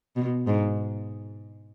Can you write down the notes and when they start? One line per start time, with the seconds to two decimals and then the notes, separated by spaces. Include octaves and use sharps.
0.16 B2
0.47 G#2